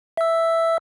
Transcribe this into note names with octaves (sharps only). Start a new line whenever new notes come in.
E5 E6